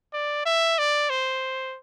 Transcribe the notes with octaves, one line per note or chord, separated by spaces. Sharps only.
D5
E5
D5
C5